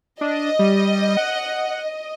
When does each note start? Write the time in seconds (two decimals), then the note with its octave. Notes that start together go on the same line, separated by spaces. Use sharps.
0.21 D4 D#5
0.59 G3
1.17 F#5